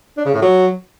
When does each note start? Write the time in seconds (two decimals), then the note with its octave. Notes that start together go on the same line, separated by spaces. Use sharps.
0.18 D4
0.26 C#3
0.34 A2
0.42 F#3